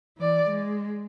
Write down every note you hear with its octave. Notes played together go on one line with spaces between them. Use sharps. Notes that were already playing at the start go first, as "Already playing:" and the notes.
E3 D5
G#3